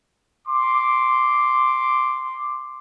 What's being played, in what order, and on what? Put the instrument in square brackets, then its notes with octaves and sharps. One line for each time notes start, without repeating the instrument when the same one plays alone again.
[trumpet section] C6 D6